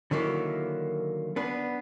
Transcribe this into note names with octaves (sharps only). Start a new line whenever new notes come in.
D3 D#3 F#3 A#3 E4
B3 D4 B4